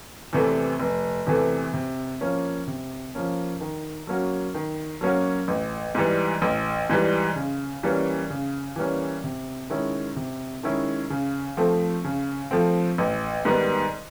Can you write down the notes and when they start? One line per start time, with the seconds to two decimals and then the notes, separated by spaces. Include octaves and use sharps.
0.33 E2 C3 E3 A3
0.80 F1
1.26 E2 C3 E3 A3
1.74 C3
2.21 F3 A#3 C#4
2.67 C3
3.15 F3 A#3 C#4
3.61 D#3
4.07 F#3 A#3 C#4 F#4
4.54 D#3
5.01 F#3 A#3 C#4 F#4
5.48 A1
5.95 G#2 E3 G3
6.42 A1
6.89 G#2 E3 G3
7.36 C#3
7.83 E3 G3 A#3 C#4
8.30 C#3
8.76 E3 G3 A#3 C#4
9.24 C3
9.70 D#3 G#3 C#4 E4
10.16 C3
10.63 D#3 G#3 C#4 E4
11.10 C#3
11.57 F3 A3 C4
12.04 C#3
12.51 F3 A3 C4
12.98 A1
13.45 G#2 D#3 G3 B3